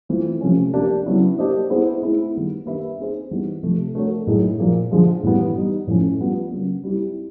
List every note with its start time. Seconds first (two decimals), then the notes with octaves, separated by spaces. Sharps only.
0.09 E3 A3 C4 F4
0.41 C3 F3 A3 C#4
0.74 A#3 D4 G4
1.06 C#3 F#3 B3 E4
1.38 A#3 D4 G4 C5 D#5
1.69 G#3 B3 E4 G#4 C5
2.02 A3 C4 E4 G#4
2.34 D#3 G3 B3
2.66 A#3 D4 G4 B4 E5
2.99 C4 D#4 G#4 C5
3.31 E3 G3 B3 D#4
3.63 C3 F3 A3
3.95 A3 D4 F#4 A#4 C#5
4.27 A2 F#3 A#3 D#4 G#4
4.60 A#2 F3 A#3
4.91 D3 F3 G#3
5.23 A2 E3 G3 B3
5.55 G3 B3 D#4
5.87 A2 F3 A3 C#4
6.20 G3 B3 D4 F4
6.51 C#3 F#3 A#3
6.84 G3 C4 E4 G4